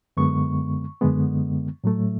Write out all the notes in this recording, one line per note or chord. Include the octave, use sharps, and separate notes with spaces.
F#2 D3 G#3 B3 C#6
F#2 D3 G#3 B3
A2 F#3 A3